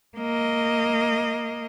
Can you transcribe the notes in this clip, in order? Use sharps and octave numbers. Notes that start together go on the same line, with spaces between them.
A#3 D#5